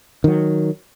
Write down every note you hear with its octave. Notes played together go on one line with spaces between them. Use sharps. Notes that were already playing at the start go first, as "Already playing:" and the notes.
D#3 F#3